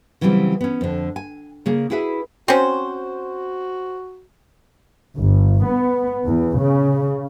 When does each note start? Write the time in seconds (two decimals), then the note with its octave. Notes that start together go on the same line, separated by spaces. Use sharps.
0.21 C#3 E3 F#3 G3 B3 C4
0.61 B3 C#4
0.81 F2 D3
1.16 G#5
1.66 C#3 A#3 G#4
1.90 E4 F#4 G#4 B4 E5
2.48 C4 C#4 F#4 C5
5.17 G1
5.64 B3
6.26 E2
6.58 C#3